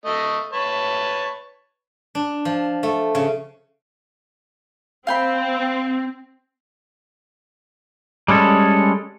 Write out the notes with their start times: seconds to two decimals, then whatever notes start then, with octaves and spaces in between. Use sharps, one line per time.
0.05 A3 D#5
0.53 B4 C#5 A5
2.15 D4
2.45 F3
2.83 A3
3.15 C#3
5.07 C4 F5 G5 B5
8.28 G3 G#3 C#4 A4